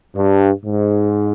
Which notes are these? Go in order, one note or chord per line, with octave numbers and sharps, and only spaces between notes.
G2
G#2